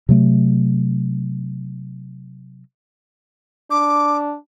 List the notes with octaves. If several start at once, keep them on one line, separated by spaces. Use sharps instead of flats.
C3 F#3 A3
D4 D6